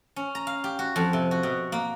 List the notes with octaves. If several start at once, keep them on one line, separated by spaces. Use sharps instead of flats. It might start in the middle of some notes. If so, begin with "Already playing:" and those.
C#4
A#5
F5
G4
F#4
F2
C3
F#4
B2
A#3